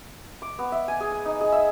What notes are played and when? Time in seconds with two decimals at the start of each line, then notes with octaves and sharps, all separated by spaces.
0.42 D6
0.59 B3
0.72 E5
0.88 G#5
1.00 G#4
1.12 G#5
1.25 D#4
1.41 G#4
1.52 E5